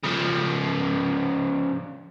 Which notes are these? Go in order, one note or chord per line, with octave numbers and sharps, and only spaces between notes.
C#3 F3